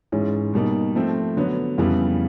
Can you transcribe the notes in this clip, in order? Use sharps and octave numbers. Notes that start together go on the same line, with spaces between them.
G#2 E3 G#3 C#4
B2 G3 A#3 D#4
F3 A3 C4
D3 F#3 B3
F2 C#3 E3 G3 B3